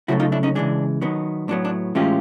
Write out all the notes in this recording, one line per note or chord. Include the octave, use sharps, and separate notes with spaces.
C#3 F#3 A3 E4 F#4
D#4 F4
D4 E4
C#4 D#4
C#3 E3 G#3 D4
D#3 F#3 B3
A2 F#3 B3 D4
D4
A2 E3 G#3 C#4 F4 G4